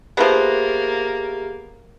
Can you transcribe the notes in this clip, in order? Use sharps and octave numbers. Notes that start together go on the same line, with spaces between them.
F3 A#3 B3 G4 G#4 E5